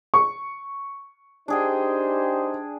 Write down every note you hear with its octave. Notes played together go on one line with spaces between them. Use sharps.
C#6
D4 D#4 G4 G#4 C5 G5